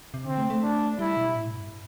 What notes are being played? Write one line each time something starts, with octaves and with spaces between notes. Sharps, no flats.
C3
D3 C4
A3
A3
D4
G3 E4
B2
A2
G2